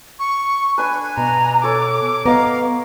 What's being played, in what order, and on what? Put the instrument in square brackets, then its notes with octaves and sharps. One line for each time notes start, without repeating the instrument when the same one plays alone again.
[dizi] C#6
[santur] D4 B4 [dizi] G#5
[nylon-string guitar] B2 [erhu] A#5
[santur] A4 C#5 [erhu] D6
[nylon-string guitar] B3 D#5 [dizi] F5 [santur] A#5